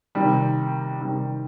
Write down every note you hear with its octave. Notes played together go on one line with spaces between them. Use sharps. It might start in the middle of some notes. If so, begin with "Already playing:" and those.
C3 D#3 G3
C3 D#3 G3